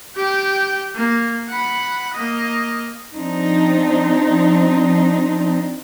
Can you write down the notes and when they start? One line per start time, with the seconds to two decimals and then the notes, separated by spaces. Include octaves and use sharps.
0.15 G4 G5
0.95 A#3
1.49 F#5 B5
2.14 A#3 D#5
3.15 F3 C4 D4 D#4